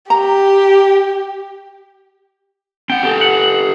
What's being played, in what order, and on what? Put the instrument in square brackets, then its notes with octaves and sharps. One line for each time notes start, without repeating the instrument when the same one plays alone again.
[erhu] G4 [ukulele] A#5
[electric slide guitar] C4 F#5 [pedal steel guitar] G5
[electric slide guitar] G4 A4
[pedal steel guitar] F#5